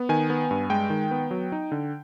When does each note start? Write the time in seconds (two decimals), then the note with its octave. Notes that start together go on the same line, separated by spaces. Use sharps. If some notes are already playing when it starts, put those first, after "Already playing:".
Already playing: B3
0.09 D#3 G#5
0.30 B3
0.51 G2
0.70 G#3 G5
0.90 D#3
1.11 B3
1.31 F#3
1.52 D#4
1.72 D3